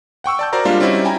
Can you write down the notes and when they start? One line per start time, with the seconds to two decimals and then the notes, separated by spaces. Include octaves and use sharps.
0.24 F#5 G5 C#6 E6
0.39 D5 A5 G6
0.53 F#4 A#4 C5 D5 A#5
0.65 G3 G#3 A#3 D4 F4
0.80 G3 C4 C#4 D#4 E4 F#4
1.05 E4 G5 G#5 A#5